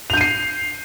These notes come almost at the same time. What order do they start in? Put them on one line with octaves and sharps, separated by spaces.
F7 G6 D#7 C7